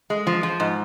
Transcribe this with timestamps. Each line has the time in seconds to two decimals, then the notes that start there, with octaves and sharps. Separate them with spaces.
0.10 G#3
0.27 F3
0.43 F3
0.60 G#2